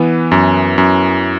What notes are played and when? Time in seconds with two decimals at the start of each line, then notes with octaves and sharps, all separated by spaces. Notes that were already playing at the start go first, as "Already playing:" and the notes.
Already playing: E3 B3
0.31 F#2
0.78 F#2